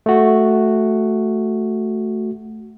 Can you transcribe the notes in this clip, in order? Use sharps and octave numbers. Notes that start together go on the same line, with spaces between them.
A3 F#4